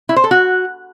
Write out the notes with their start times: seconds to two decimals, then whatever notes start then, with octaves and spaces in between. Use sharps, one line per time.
0.09 E4
0.16 C5
0.24 A4
0.31 F#4